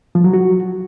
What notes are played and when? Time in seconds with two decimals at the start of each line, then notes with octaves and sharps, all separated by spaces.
0.15 F3
0.24 F#3
0.34 F#4